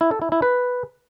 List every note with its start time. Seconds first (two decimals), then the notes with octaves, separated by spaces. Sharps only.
0.01 E4
0.11 A4
0.22 E4
0.32 E4
0.42 B4